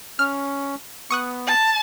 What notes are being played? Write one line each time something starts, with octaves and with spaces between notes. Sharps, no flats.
C#4 F6
B3 C#6 D#6 F#6
A5